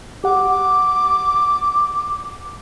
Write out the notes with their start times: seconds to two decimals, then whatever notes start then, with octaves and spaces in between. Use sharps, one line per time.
0.24 G4 F#5 D6